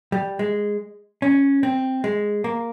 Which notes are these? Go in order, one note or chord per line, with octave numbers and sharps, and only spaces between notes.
G3
G#3
C#4
C4
G#3
A#3